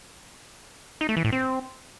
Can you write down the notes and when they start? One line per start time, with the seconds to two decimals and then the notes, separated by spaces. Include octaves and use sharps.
1.01 D#4
1.09 A3
1.17 E3
1.25 A2
1.32 C4